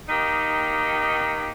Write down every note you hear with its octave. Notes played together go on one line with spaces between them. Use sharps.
D#3 A#3 D#4 G4